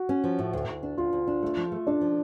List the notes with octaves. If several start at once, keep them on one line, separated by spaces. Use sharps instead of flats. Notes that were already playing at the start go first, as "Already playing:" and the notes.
Already playing: F#4
C#4
F3
A2
D2
D2
D4
D2 F4
D2
D4
A3
F3
A3
D4 A4
F3